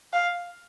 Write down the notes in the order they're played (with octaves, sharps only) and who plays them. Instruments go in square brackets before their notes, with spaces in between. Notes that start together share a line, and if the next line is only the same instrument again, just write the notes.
[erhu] F5